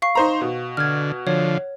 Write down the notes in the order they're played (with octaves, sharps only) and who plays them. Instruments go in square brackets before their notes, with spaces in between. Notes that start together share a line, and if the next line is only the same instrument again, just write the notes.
[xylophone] F5 C#6 C7
[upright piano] D#4 C5 A#5
B2
[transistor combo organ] D3 [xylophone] F6 G#6
[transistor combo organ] D3 F3 [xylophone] C#5